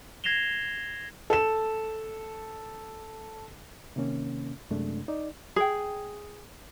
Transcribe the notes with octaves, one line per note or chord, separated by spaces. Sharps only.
G#6 A#6 C7 E7 F7 G7
A4 E7
C3 D#3 A#3 C#4
F#2 C3 G#3 A3 D4
D#4 D5
G#4 G5